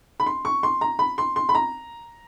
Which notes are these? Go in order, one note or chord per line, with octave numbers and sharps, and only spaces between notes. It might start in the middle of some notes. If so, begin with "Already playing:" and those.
B5
C6
C#6
C6
A#5
B5
C6
C6
B5
A#5